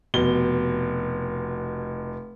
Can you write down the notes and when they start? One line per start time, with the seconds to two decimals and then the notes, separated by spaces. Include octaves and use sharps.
0.14 F1 B2 G7